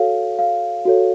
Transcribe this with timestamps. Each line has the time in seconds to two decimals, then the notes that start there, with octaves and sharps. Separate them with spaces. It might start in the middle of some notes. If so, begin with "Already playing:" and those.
Already playing: F#4 A4 C#5 F5
0.39 F5
0.85 F#4 A4 C#5